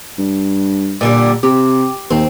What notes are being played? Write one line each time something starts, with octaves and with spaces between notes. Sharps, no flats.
G2
A#2 D3 G3
C3 G4
D#2 C4